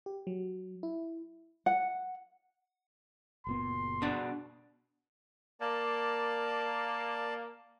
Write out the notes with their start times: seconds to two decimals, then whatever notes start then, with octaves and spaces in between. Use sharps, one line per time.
0.06 G4
0.27 F#3
0.83 E4
1.66 F#5
3.47 F#1 A#2 B3 C6
4.02 B2 D4
5.61 A#3 D5 A5